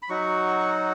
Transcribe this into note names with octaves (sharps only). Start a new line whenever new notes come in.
B5
F#3 D#4 F#4 C#6